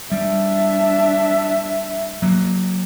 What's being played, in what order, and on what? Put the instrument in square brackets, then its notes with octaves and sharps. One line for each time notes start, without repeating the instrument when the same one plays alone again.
[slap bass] G3 [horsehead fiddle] D4 E5
[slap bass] F#3 A#3